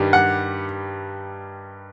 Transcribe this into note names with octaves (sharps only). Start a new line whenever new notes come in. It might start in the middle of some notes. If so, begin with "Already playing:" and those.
Already playing: G2 D#3 G3
F#5